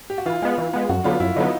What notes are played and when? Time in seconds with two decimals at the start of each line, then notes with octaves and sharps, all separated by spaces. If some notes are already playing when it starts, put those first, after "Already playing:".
0.10 G4
0.18 F#4
0.26 E3 F4
0.42 G#3 B3
0.58 E3
0.73 G#3 B3
0.89 F#2 F#4
1.04 D3 F#3 B3 F4
1.20 F#2 E4
1.36 D3 F#3 B3 D#4